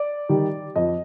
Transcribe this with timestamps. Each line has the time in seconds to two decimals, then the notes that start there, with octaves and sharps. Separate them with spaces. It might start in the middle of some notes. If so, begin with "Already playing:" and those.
Already playing: D5
0.29 D#3 G3
0.76 F2 D#5